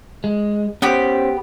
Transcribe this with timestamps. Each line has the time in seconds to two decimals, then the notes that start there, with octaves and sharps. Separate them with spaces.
0.24 G#3
0.82 B3 C#4 G4 C5 B5